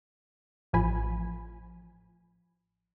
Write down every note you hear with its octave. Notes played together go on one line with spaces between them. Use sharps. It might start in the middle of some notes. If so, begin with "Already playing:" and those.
A1 F3 G#5 B5